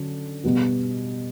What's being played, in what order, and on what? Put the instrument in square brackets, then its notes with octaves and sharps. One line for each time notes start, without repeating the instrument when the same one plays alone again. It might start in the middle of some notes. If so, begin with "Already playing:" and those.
Already playing: [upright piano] D3 F#3 C#4
B2 G3 B3 F#4